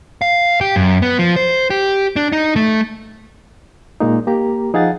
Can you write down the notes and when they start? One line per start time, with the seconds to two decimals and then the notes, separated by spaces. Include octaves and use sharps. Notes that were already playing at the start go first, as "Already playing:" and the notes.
0.22 F5
0.61 G4
0.76 F#2
1.02 B3
1.19 F3
1.36 C5
1.70 G4
2.16 D4
2.32 D#4
2.56 A3
4.00 A#2 G#3 A#3 D#4
4.27 A#3 G4 A#5
4.74 F3 D#4 G#4 F5 F#5 A6